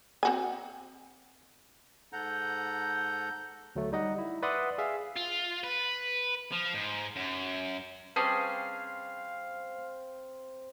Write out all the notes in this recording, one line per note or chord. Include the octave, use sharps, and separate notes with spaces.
C4 F#4 G#5
G#2 A4 F#5 A#5 G6
D2 F#3 A3
G3 D#4 D#5 F#5
E4
B4 D5 E5 F#5 C6 D#6
G#4 E5 F5
F4
B4
F3
G#2
F#2
G3 C4 C#4 G#4 B4 F5 A5 D#6